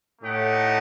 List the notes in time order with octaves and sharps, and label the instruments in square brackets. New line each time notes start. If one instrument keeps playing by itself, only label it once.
[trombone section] A2 [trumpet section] A3 D#4 G4 D#5 F#5